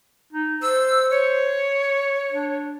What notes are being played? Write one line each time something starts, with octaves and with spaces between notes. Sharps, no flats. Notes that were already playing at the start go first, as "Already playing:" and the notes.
D#4
C5 E6
C#5
D4